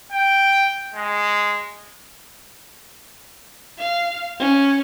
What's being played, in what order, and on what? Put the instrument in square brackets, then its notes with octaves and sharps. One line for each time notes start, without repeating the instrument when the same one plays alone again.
[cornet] G5
G#3
[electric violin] F5
C#4